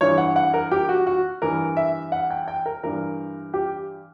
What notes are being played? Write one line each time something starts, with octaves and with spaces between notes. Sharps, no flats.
G2 E3 C#5
F#5
F#5
A#4
G4
F#4
F#4
G2 E3 A#4
E5
F#5
G5
G5
A#4
G2 E3 A#4
G4